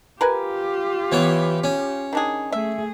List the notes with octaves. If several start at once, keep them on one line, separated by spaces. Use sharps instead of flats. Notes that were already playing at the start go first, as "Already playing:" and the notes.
F4 G4 A#4 B4 G#5
E3 B3 C#5
C#4
D#3 D4 G#4
A3 G#4 E5